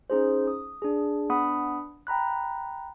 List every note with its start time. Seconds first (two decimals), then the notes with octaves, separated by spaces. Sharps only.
0.10 C#4 D#4 G#4 C5
0.47 D#6
0.82 D4 G#4
1.30 B3 D4 F#5 B5 D#6
2.07 G5 A#5 B5 F#6